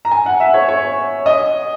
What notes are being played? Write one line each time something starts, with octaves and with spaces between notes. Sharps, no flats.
A#5
G#5
F#5
E5
C#5
C#5
D#5